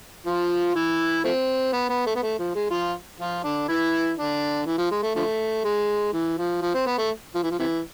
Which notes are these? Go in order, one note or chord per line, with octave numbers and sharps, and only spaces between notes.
F3 F4
E3 E4
F3 A3 C4
B3
B3
A3
B3
A3
F3
G#3
F3 F4
F3 F4
D3 D4
E3 E4
D3 D4
E3
F3
G#3
A3
D3 F3 A3
G#3
E3
F3
F3
C4
B3
A3
F3
E3
F3
C3 E3